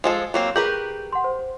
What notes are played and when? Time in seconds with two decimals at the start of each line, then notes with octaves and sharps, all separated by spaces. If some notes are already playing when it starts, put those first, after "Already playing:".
0.04 F3 G#3 A4
0.34 F#3 A#3 C4
0.56 G4 G#4 A#4 B4 G6 F#7
1.13 F#5 C6
1.24 C5